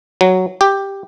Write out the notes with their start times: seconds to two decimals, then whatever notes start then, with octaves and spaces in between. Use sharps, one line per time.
0.21 F#3
0.61 G4